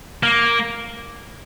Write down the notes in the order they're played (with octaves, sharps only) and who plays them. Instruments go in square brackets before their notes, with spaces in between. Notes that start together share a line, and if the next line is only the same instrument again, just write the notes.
[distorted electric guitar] A#3